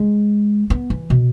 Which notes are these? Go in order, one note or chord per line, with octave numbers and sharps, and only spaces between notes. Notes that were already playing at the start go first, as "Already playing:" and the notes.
Already playing: G#3
B3
E3
B2